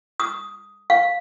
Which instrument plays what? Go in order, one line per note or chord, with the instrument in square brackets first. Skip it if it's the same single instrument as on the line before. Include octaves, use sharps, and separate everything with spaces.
[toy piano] D#6
F5